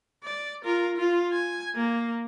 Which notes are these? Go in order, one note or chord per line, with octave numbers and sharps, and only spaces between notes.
D5
F4 A#4
F4
G#5
A#3